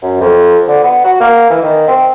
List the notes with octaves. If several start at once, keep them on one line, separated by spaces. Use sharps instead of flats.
F#2
F2
D3
B3
F#4
A#3
E3
D#3
C4